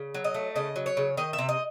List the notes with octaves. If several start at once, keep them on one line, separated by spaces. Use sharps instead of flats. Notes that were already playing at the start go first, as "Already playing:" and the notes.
Already playing: C#3
F#3
D#5
A3
C#3 D#5
F#3
C#5
C#3
D#3 D#5
E5
C3
D#5